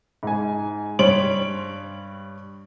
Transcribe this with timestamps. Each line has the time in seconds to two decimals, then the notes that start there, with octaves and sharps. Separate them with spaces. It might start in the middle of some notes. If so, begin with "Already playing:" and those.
0.23 G#2 G#5
0.99 G2 G3 C#5 C6 D7 F#7